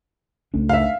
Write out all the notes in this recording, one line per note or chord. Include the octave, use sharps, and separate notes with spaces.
C#2 A3 D4
E5 F5